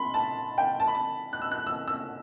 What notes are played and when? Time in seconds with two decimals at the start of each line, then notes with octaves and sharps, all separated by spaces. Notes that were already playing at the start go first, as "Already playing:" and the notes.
Already playing: B5 C6
0.14 A5
0.58 G5
0.80 A5
0.88 B5
0.95 A5
1.33 F#6
1.42 E6
1.51 F#6
1.67 E6
1.88 E6